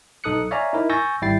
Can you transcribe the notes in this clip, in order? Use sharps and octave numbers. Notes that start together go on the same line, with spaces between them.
B1 D#4 A4 D#6 F#6 C#7
C#5 D5 E5 F5 G#5 A#5
D#4 E4 A#4
G#5 C#6 E6 G6 A6 A#6
G#1 G3 E4 G5 A6 C7